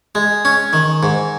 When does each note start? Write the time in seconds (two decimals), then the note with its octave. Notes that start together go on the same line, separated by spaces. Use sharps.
0.15 G#3
0.45 C#4
0.73 D#3
1.03 G#2